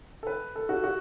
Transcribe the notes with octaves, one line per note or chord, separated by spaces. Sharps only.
A4
B4
A4
F#4
F#4